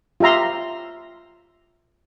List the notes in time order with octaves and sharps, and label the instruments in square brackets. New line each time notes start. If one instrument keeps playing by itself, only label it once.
[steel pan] F4 G4 E5 A#5 C6